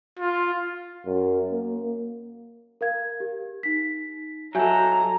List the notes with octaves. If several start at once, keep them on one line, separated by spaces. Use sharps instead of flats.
F4
F#2
A#3
A#4 F5 G#6
G4
D#4 B6
F#3 A4 E5 G#5 A#5 G6